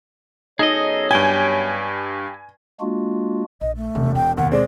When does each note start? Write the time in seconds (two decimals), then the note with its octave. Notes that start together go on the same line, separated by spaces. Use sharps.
0.59 F#2 B3 D#4 G#4 A4 C#5 D#5
1.11 G2 G4 G5 G#5 G#6
2.80 G#3 A#3 D4 F4 F#4
3.61 A#1 D#5
3.76 A3
3.95 E1 C3
4.15 B3 G5
4.37 E1 A1 D#2 F#5
4.52 B2 G#3 C4 D5